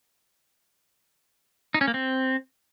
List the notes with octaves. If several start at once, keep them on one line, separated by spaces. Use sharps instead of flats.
D#4
C#4
A#3
C4